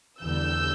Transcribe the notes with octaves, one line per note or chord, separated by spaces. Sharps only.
E2 D3 G3 E6 G6